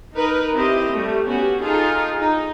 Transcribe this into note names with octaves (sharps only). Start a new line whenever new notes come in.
D#4 A#4 B4
C4 E4 G4 D#5
G3 A3
B3 C#4 F#4 G4
D#4 F4 G#4 A4
D#4